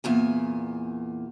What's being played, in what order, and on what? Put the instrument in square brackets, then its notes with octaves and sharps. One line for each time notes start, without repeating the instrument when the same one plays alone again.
[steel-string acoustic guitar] E2 A#2 G#5